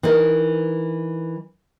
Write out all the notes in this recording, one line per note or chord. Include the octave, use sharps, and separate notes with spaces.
E3 D#4 A#4